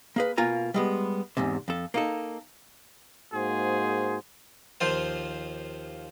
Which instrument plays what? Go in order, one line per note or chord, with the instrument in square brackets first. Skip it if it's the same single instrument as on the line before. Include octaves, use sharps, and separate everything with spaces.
[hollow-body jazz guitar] A#3 G#4 B4
B2 A#3 F4 G#5 A#5
G3 G#3 B3
E2 G#2 C3
F2 A4
A#3 D#4 A4
[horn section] G#2 A#3 F#4 G#4 C5
[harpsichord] D#2 F3 F4 C5